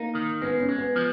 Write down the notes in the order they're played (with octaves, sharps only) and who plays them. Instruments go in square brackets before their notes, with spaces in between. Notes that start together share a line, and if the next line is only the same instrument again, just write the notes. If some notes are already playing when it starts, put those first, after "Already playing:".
Already playing: [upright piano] A#3 [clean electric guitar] D#4
[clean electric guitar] D#3
[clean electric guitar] G#3 [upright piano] B3
[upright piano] C#4
[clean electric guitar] G#3
[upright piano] B3
[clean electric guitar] F3